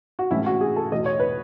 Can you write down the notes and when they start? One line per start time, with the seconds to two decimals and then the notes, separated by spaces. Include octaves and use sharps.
0.19 F#4
0.31 A2 E3 G#3 C#4 E4
0.46 F#4
0.61 G#4
0.76 A4
0.92 E2 B2 A3 D#5
1.06 C#5
1.19 B4